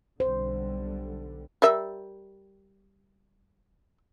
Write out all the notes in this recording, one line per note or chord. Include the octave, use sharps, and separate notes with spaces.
B1 D3 G3 C5
G3 A#4 E5